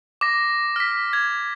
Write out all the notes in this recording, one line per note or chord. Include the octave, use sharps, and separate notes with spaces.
D6 A#6
F6 B6
G#6